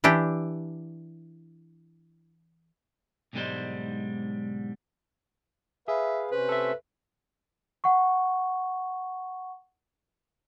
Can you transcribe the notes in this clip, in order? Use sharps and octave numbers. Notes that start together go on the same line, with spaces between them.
E3 D4 E4 G4
B1 G#2 D3 G3 G#3 C5
G#4 B4 E5 F5
C3 C#4 B4 C5
A4 E5
F#5 C#6